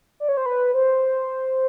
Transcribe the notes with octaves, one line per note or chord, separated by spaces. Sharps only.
D5
C#5
C5
B4
C5